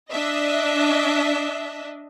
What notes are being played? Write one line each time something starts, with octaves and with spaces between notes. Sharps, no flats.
D4 D#5 E5